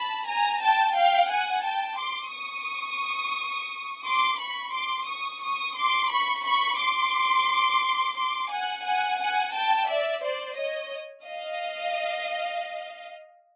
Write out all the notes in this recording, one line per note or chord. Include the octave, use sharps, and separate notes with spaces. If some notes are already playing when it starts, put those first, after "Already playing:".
Already playing: A5 B5
G#5 A#5
G5 A5
F5 G5
F#5 G#5
G5 A5
C6 D6
C#6 D#6
C6 D6
B5 C#6
C6 D6
C#6 D#6
C#6 D#6
C6 D6
B5 C#6
B5 C#6
C6 D6
C6 D6
F#5 G#5
F#5 G#5
F#5 G#5
G5 A5
D5 E5
C5 D5
C#5 D#5
D#5 F5